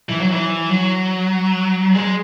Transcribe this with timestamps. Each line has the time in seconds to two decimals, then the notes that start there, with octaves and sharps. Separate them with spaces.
0.09 E3
0.20 F#3
0.32 E3
0.71 F#3
1.94 G#3